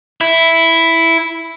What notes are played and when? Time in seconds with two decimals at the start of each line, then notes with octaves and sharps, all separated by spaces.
0.21 E4